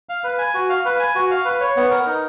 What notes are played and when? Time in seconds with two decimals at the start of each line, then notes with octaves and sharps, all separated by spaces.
0.09 F5
0.24 B4
0.39 G#5
0.54 F#4
0.69 F5
0.85 B4
0.99 G#5
1.16 F#4
1.31 F5
1.45 B4
1.60 C#5
1.76 B3
1.91 A#4
2.06 D#4